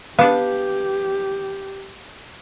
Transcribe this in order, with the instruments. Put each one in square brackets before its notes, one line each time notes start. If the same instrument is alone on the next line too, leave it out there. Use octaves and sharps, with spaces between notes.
[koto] B3 D4 [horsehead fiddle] G4 [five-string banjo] F5